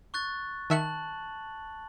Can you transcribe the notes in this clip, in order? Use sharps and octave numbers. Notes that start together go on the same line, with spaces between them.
C#6 F#6 A6
D#3 E5 A5 F#6 C#7 F#7